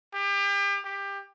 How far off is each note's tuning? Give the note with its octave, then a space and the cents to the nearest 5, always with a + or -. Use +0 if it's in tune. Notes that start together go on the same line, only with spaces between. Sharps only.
G4 +35
G4 +20